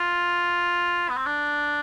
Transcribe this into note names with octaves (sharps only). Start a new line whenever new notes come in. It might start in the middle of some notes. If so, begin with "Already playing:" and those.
Already playing: F4
B3
C4
D4